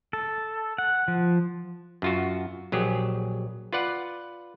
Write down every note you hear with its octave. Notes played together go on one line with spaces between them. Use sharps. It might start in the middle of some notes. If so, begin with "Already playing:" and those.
A4
F#5
F3
F#2 F4 F#4
A#1 F#3 G4 G#4
F4 B4 D5 F#5